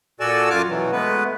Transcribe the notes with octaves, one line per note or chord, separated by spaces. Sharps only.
A#2 F#4 A4 D5 G#5 E6
F#2 F4 G#5 A5 D6 F6
B2 E3 F#3
G#3 A3 B3 B4